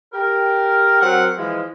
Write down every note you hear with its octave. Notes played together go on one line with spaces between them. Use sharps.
G4 A#4
F#3 C4 A#4 F#5
E3 F3 G#3